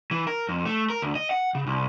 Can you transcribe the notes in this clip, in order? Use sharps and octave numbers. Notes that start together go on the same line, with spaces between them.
E3
A#4
F2
A3
A#4
D2
D#5
F#5
C#3
C2